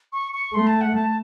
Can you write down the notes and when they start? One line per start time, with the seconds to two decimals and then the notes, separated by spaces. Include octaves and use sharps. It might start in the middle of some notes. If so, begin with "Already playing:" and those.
0.13 C#6
0.33 C#6
0.54 A3 C6
0.67 A5
0.81 F#5
0.95 A5